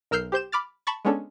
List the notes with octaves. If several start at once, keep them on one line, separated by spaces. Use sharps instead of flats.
B1 A#4 E6 F6 G6 C7
G4 C5 G6 E7
B5 D6 F6 A6
A5 B5 C#6 A6
G#3 B3 C#4 D4 A4